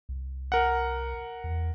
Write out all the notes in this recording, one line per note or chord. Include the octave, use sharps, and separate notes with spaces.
C2
A#4 F#5
E2